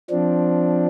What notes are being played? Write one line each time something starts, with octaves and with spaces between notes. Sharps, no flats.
F3 C4 D4